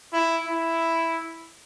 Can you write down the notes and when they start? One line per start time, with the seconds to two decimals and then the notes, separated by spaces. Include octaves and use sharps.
0.13 E4
0.47 E4